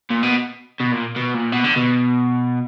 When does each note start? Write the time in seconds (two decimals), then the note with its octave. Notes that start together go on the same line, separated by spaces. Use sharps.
0.10 A#2
0.23 B2
0.80 B2
0.92 A#2
1.17 B2
1.35 A#2
1.52 B2
1.64 D3
1.76 B2